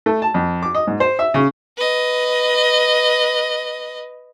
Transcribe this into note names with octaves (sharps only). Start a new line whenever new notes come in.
A3
A5
F2
D6
D#5
G#2
C5
E5
C#3
B4 D#5